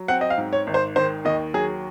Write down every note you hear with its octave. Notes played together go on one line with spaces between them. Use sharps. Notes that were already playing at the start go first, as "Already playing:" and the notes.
Already playing: F#3
C4 F#5
D#5
F5
G#2
C#5
G#1
C5
D#3 C5
D#2 D#5
F#3 G#4